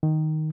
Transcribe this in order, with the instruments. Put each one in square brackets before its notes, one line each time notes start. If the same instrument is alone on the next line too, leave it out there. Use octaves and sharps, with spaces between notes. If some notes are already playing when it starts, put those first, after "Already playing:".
[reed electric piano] D#3